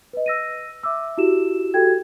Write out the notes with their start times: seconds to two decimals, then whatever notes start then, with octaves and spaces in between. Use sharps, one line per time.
0.13 B4 D#5
0.26 E6 A#6 D#7
0.83 E5 D6 E6
1.17 E4 F#4 G4 E7
1.74 F#4 G4 A4 G5 G#6